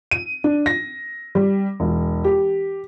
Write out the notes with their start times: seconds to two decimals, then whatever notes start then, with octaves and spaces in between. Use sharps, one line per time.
0.11 D#7
0.44 D4
0.66 A#6
1.35 G3
1.80 E1
2.24 G4